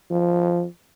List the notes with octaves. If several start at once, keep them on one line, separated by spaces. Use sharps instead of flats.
F3